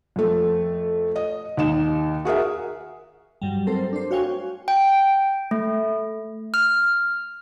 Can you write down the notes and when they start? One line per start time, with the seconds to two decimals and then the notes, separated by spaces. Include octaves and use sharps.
0.16 F2 A3
1.16 D#5
1.57 D#2 D#4 E7
2.25 F#4 G#4 A#4 E5
3.42 G2 F#3 G3
3.67 A3 C4 A4 A#4 C5
3.93 D4 C5
4.11 F#4 C#5 F5 G5 G#5 C#6
4.68 G5
5.51 A3
6.54 F6